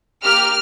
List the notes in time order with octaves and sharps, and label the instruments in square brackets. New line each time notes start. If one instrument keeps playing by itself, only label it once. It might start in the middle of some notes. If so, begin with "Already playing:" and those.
[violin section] A#3 G4 F6